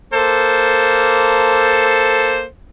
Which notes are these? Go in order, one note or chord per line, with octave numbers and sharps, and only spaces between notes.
A#3 A4 C5